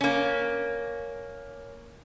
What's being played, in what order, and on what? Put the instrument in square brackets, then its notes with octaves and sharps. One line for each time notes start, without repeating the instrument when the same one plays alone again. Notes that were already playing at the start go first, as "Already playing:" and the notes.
[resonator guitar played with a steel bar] A#3 C#4